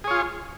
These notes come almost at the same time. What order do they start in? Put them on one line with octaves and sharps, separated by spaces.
G#4 C#5 F4